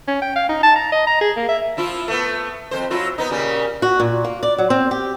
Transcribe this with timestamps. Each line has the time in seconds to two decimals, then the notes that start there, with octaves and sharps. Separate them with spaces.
0.08 C#4
0.22 G5
0.36 F5
0.49 D#4
0.63 A5
0.76 A#5
0.92 D#5
1.07 A#5
1.21 G#4
1.37 A#3
1.48 E5
1.77 F3 E4 F4
2.08 A3 B3
2.71 F2 C5
2.90 F#3 E4 F4
3.18 B3 D#4
3.30 A#2 C#3 G3
3.82 F#4
4.00 A#2
4.25 A#3
4.43 D5
4.58 F#3
4.70 C4
4.91 G4